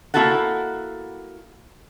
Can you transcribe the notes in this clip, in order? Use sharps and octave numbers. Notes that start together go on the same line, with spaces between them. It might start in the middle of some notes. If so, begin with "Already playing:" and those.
A#3 C4 E4 F#4 A4 F#5